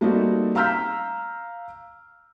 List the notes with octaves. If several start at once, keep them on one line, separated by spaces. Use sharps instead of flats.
G3 A3 A#3 C4 D#4 F#4
F5 A#5 E6 F6 G6 B6